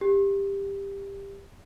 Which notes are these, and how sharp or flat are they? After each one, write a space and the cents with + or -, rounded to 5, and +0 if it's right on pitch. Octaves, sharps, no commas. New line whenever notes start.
G4 +15